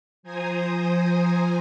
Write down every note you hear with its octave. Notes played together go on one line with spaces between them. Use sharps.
F3 C5 G#5 A#5 D#6